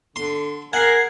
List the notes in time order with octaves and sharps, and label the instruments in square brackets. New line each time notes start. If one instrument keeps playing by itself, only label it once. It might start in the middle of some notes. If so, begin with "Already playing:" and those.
[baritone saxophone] D3 [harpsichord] C6
[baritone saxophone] G#4 [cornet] A#4 [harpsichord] F#5 [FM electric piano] G#6 C7